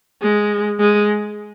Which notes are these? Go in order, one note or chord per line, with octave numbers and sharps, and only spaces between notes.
G#3
G#3